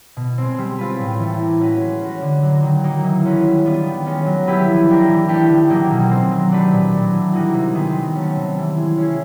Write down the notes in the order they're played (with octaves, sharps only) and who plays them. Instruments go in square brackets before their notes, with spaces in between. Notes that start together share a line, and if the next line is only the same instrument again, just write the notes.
[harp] B2
G#3 C4
G3
C4 F4 G#4 B4
A2
E3 A3
A#3
C#4 F#4 B4
G#3
C#4 F#4
D3
F#3 A#3
D#3
F#3 A#3 D#4
E3
G#3 C#4 F#4 B4
G3
B3 D4 F4
D#3
G#3 C#4
F#3
B3 E4 G4 B4
F3
A3 D4 G4 A#4
E3
A3 D4 G4
D#3
F#3 A#3 D#4
B2
G#3 C4
F#3
A3 D4 G4 B4
A#2
F#3 A3
E3
G3 A#3 D#4 F#4
C3
D#3 G#3 B3
F#3
A3 C#4
C3
E3 G3
G#3
C#4 E4 G#4